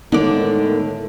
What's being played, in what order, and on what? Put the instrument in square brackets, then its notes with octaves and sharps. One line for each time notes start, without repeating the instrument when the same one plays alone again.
[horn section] A2 [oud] D3 D5 [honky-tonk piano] D#3 [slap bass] G#3 B3